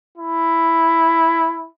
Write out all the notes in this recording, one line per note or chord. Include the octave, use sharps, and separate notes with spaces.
E4